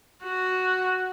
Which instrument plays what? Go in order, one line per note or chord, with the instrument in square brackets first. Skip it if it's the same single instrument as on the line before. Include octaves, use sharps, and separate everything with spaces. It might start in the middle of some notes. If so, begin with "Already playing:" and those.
[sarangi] F#4